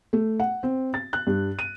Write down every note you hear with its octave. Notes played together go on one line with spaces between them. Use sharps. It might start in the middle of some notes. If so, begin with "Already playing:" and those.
A3
F#5
C4
A6
F#6
G2
D#7